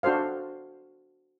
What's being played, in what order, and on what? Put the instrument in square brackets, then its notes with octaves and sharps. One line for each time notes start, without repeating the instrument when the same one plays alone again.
[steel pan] D4 F#4 A4 C5 F5